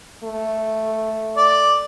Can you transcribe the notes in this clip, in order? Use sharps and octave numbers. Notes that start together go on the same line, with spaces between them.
A3
D5